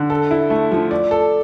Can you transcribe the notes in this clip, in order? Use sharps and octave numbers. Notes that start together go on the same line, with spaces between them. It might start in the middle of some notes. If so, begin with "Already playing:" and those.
Already playing: D3
A4
E4
A3
F3
D5
A4